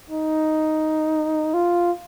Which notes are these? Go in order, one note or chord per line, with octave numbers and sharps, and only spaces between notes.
D#4
F4